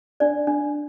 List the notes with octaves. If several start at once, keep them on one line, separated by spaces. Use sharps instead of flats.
D4 D5
D4